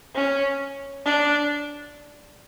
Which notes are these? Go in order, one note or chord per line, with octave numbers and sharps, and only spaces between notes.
C#4
D4